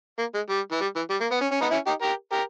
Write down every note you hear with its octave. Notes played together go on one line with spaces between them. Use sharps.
A#3
G#3
G3
E3
G3
E3
G3
A#3
B3
C#4
C#4
B3 D#4
C#4 E4
D#4 G4
G4 A#4
G4 A#4